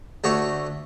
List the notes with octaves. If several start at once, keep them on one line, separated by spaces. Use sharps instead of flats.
D2 A3 F#4 C#5 C#6